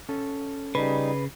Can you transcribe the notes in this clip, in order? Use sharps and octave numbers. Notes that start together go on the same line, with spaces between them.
C#4 A4
C#3 G3 D#4 B4